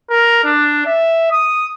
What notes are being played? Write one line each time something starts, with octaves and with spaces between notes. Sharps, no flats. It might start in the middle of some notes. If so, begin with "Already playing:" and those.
A#4
D4
E5
D#6